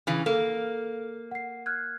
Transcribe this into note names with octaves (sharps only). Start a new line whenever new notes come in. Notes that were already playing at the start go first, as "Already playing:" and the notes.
C#3 E3
A#3 A4
F#5 C7
F6 F#6 G#6